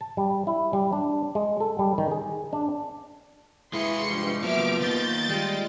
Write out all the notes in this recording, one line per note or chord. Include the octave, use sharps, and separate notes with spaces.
A5
G3
E4
G3
D4
G#3
A4
G3
D#3
G#4
D4
G#3 E4 G#4 B4 C6 C#7
G2 F3
F#3 A#3 B3 E5 D6 F6
D#3 A#3 G6 A6
G3 G#3 F4